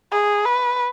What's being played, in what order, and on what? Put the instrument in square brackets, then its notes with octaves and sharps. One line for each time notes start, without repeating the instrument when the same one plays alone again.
[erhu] G#4
B4